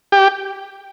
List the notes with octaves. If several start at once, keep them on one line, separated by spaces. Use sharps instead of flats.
G4